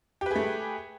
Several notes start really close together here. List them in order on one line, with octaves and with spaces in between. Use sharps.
G4 B4 G#4 A3